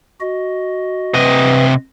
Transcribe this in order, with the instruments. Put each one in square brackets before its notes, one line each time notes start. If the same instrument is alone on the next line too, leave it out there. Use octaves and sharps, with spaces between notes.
[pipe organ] F#4 D#5
[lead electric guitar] C3 D#5 [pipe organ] B4